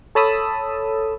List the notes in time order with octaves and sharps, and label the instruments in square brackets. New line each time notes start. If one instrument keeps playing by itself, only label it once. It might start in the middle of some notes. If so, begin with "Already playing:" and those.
[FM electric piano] A4 C#5 A5 B5 D#6 E6